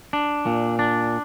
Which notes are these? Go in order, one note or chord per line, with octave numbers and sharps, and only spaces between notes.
D4
A#2
D4